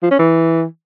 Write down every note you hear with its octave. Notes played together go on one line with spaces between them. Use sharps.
F3
C#4
E3